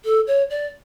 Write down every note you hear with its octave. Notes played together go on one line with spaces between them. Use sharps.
A4
C#5
D5